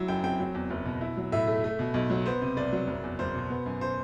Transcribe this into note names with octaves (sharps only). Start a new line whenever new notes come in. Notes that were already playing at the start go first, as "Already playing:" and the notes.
Already playing: F#3 E4 E5
F#2 G5
C4 G5
F#3
E2
F#1
B2
E4
F#3
A2 E5
A3
A3
B2
B1
F#3
B3 C5
C3
C2 D5
F#3
F#1
E2
F#1 C5
B2
B3
F#2
C5